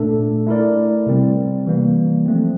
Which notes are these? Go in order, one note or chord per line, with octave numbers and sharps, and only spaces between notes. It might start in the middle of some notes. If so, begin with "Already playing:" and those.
Already playing: A#2 A3 D4 A4
A3 E4 A#4 D5
C3 G3 C4
E3 G3 A#3
F3 A3 C4